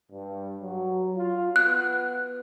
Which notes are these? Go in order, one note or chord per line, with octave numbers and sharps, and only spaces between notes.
G2 G3
F#3
F4
B3 F#6